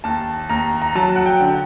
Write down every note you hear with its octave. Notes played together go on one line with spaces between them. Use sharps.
D#2 A5
D#2 A#5
A#5
F#3 A5
F#5
G5
D3